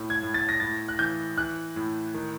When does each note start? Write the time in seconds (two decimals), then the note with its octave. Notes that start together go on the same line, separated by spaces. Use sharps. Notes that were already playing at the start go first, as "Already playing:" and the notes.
Already playing: A2
0.10 G#6
0.23 A2
0.34 A6
0.49 A#6
0.60 A2 A6
0.88 F#6
0.99 E3 G6
1.38 E3 F#6
1.76 A2
2.14 D#3